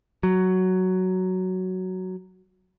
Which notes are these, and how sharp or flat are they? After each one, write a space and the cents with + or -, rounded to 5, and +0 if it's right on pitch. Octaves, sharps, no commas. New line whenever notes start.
F#3 +5